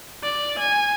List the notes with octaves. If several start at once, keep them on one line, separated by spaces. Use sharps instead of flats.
D5
G#5